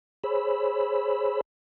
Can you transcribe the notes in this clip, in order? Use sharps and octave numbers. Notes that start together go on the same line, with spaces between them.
G#4 C5 C#5 B5 E6